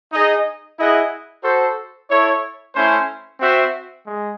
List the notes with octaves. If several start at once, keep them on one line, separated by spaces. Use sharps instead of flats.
D#4 G#4 D#5
E4 G#4 D#5 F#5
F#4 A4 C5
E4 A4 C#5
A3 C#4 E4 C5
C4 F#4 C5 E5
G#3